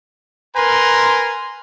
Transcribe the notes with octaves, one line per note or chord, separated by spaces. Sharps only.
A#4 B4 G#5 A#5 C6